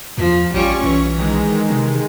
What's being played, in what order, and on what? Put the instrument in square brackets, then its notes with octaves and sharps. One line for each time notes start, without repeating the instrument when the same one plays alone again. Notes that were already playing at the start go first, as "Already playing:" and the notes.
[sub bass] E2 [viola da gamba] F3
[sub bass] A1 [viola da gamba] G3 F4 [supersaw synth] C#4 C#6
[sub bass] B1 [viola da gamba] E3
[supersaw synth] D#3 G#3
[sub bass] C3